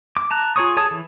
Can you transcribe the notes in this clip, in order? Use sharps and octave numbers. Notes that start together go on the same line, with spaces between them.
D6
A5 A#5 F#6
F4 G#4 C#5 C#6 D#6
G#4 A4 C#5 A5 D#6
E3